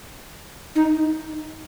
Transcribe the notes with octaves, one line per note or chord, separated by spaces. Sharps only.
D#4